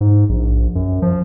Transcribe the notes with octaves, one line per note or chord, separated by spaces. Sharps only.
G#2
A#1
F#2
F3